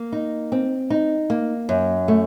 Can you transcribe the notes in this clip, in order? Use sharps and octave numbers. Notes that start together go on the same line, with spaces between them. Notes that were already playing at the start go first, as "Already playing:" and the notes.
Already playing: A#3
D#4
C4
D#4
A#3
F#2
A3